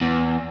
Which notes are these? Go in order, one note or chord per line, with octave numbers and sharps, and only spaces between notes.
E2